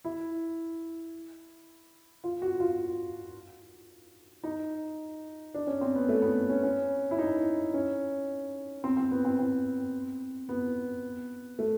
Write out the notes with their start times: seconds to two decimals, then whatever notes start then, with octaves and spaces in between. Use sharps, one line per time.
0.05 E4
2.24 F4
2.42 F#4
2.60 F4
4.44 D#4
5.54 D4
5.67 C#4
5.81 C4
5.95 B3
6.09 A3
6.22 B3
6.49 C#4
6.63 C#4
7.11 E4
7.19 D#4
7.74 C#4
8.84 C4
8.97 C4
9.11 B3
9.25 C4
9.39 C4
10.49 B3
11.59 A3